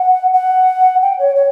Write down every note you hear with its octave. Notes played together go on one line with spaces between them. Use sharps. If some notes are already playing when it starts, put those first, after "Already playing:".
Already playing: F#5
F#5
G5
C#5
C#5